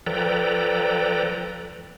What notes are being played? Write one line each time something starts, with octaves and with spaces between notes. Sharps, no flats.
F3 A4 B4 D5 G5 A#5